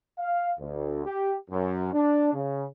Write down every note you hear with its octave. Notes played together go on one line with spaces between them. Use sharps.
F5
D2
G4
F#2
D4
C#3